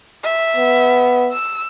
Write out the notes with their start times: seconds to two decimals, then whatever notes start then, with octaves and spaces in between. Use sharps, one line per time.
0.24 E5
0.57 B3
1.32 E6